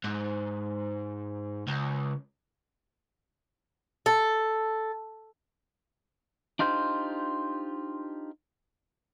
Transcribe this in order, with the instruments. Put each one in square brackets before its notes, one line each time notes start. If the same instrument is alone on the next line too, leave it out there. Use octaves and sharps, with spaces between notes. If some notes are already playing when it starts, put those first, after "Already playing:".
[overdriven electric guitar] G#2
C#2
[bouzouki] A4
[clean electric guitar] D4 D#4 F4 G4 C5